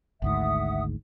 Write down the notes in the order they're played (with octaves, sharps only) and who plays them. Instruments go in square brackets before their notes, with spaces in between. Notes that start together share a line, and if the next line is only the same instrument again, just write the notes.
[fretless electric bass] G#1 D2 G#2 [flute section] E5 F#5 D#6